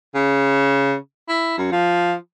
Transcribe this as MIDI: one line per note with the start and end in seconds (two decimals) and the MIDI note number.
0.15 0.94 49
1.29 1.55 64
1.58 1.67 42
1.72 2.14 53